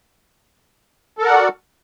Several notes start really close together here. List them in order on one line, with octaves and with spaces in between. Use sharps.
A4 A#4 F#5 D5 F#4